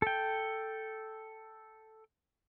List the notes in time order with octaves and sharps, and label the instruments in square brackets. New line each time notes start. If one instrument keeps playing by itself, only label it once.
[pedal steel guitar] A4 G5